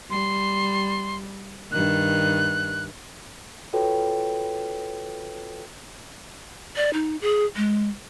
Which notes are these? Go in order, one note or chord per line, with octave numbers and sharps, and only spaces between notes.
G3 C6
G2 D#3 F#6
F4 F#4 A4 B4 C#5 G5
D5
D#4
G#4
G#3